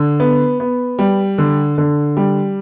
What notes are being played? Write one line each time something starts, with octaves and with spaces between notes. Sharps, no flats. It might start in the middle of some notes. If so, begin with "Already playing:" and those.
Already playing: D3
B3
B3
G3
D3
D3
G3